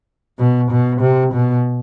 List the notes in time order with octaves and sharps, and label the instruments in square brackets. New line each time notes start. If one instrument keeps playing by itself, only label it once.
[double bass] B2
B2
C3
B2